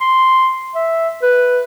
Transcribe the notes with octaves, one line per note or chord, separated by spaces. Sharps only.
C6
E5
B4